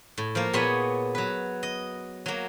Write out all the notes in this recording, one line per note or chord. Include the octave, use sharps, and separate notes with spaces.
A2
F3 A#3
A#2 B3 G#4 C#5 G#5 B5
F#3 B4
D#5
F#3 A#3